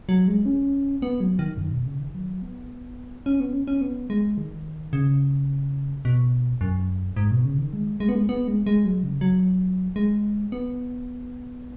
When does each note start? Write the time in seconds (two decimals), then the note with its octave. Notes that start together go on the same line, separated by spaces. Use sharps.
0.09 F#3
0.28 G#3
0.46 C#4
1.02 B3
1.20 F#3
1.39 D#3
1.57 F#2
1.72 B2
1.85 C#3
2.00 D#3
2.14 F#3
2.42 B3
3.26 C#4
3.40 B3
3.53 C#4
3.67 C#4
3.81 B3
4.10 G#3
4.37 D#3
4.93 C#3
6.05 B2
6.61 F#2
7.16 G#2
7.31 B2
7.45 C#3
7.58 D#3
7.73 G#3
8.00 G#3
8.09 B3
8.15 G#3
8.29 B3
8.48 G#3
8.67 G#3
8.85 F#3
9.03 C#3
9.21 F#3
9.96 G#3
10.52 B3